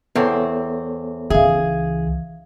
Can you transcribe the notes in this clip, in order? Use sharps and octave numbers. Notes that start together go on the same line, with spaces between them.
E2 B3 C4 A4 C#5
C#2 E3 G#4 E5 F5